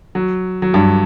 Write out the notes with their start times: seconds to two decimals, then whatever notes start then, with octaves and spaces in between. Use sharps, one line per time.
0.15 F#3
0.62 F#3
0.73 G2 G3